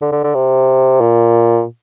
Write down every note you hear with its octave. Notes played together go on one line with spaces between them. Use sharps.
D3
D3
D3
C3
A#2